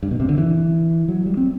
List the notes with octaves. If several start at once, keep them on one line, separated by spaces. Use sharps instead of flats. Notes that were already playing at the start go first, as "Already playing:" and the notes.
G2
B2
C3
D3
E3
F#3
G3
C4